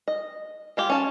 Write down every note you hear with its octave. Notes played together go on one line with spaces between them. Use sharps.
D#5
G#3 F4 G4
C#4 A5